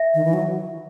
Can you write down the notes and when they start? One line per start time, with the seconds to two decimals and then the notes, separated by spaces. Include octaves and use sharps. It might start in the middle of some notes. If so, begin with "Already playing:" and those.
Already playing: E5
0.14 D#3
0.25 E3
0.34 F#3